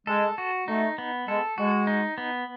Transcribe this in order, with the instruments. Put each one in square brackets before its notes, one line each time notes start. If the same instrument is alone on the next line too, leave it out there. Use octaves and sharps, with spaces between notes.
[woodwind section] G#3 [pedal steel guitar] A4
[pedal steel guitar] F#4
[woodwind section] A3 [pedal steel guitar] D#4
[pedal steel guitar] B3
[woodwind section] G#3 [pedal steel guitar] A4
[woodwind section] G#3 [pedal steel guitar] F#4
[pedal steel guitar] D#4
B3